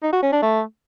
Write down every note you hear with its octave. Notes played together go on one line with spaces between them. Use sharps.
D#4
F#4
C#4
D4
A3